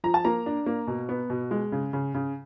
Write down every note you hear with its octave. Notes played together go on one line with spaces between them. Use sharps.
F3 A#5
A5
A#3 A#5
D4
A#3
B2
B3
B2
G#3
C#3
C#3
C#3